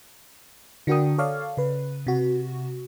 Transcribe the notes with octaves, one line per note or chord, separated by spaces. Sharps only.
D3 D4 F#4 A#4 G5 D#6
A4 C#5 D5 F5
C#3 B4
C3 F#4